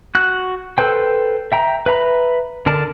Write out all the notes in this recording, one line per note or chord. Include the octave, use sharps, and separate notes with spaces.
F#4 F#6
A4 B4 C5 G5
E5 G5 A#5
B4 E5 A#5 B5
D3 A#4 D5 A5